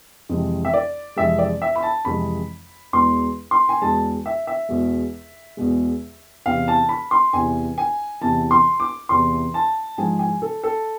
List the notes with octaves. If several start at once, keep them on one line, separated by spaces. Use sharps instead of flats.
F2 C3 E3 G#3
E5
D5
F2 C3 E3 G#3 E5
D5
E5
B5
A5
F2 C3 E3 G#3 B5
E2 B2 G#3 C6
C6
G#5
E2 B2 G#3 A5
E5
E5
E2 B2 G#3
E2 B2 G#3
E2 C3 E3 F5
A5
B5
C6
E2 C3 E3 G#5
G#5
E2 C3 E3 A5
C6
D6
E2 C3 E3 C6
A5
G#2 F3 G#3 G#5
G#5
A4
A4